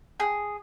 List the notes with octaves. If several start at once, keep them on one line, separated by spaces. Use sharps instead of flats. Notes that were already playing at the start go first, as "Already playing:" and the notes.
G#4